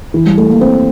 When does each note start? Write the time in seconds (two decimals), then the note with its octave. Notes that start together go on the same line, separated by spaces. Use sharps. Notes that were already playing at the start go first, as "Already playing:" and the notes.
0.14 E3
0.26 G3
0.37 A3
0.50 A#3
0.61 C4